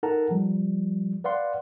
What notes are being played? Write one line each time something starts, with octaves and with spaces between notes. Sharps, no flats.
D#4 A4 A#4 F#5 A5 A#5
F3 G3
B4 D5 F5 F#5 C6